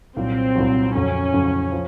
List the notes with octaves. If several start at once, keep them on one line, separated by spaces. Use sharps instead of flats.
C2 A#2 F#3 C4
C2 A#2 F#3
F2 C#3 F#3 C#4
F2 C#3 F#3
F3